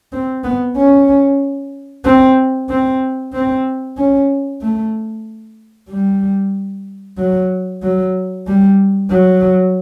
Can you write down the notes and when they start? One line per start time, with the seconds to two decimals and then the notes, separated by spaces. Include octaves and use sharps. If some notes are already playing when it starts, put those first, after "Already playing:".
0.12 C4
0.44 B3
0.76 C#4
2.05 C4
2.69 C4
3.33 C4
3.97 C#4
4.61 A3
5.89 G3
7.18 F#3
7.82 F#3
8.46 G3
9.09 F#3